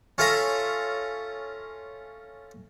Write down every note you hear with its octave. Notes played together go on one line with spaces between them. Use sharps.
C#4 F4 A4 E5 F5 A#5